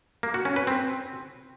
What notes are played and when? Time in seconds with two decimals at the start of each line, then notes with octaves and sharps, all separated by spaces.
0.23 A#3
0.34 F#4
0.45 C#4
0.56 B4
0.67 C4